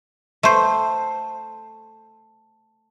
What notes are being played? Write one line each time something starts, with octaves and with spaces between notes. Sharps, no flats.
A3 C5